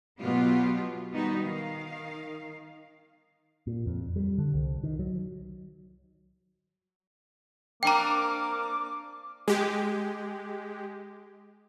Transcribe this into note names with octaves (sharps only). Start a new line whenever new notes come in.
B2 F#3 B3 F4 G4
D#3 G3 B3 D#4 F#4
D#3 F5
A#2
F2
G3
D3
C2
D#3
F#3
A#3 C4 D4 A#4 G5 A#5 D6
G#3 G4